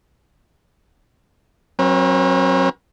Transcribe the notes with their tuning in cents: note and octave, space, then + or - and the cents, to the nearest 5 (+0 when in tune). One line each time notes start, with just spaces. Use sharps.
F#3 +0 C4 +45 B4 -45